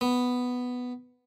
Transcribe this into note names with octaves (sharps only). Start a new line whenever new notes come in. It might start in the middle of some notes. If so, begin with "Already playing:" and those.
B3